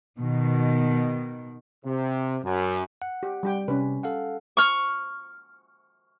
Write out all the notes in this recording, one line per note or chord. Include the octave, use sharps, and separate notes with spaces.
B2 D#3
C3
F#2
F#5
G4
G3 G4 G5
C3 C#4 B4
A4 F5 F#5
C#6 F6